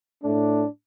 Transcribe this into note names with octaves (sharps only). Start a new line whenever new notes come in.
A2 A3 D4